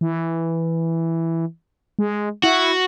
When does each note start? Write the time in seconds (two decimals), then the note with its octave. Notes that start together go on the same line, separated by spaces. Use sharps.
0.01 E3
1.99 G#3
2.43 E4 F#4